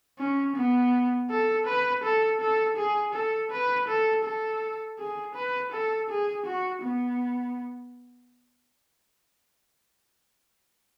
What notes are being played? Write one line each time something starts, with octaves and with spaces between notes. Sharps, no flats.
C#4
B3
A4
B4
A4
A4
G#4
A4
B4
A4
A4
G#4
B4
A4
G#4
F#4
B3